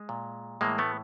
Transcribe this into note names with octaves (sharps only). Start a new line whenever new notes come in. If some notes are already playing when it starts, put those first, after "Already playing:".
Already playing: G#3
A#2
A2 E3 G#3 A#3
A3 B3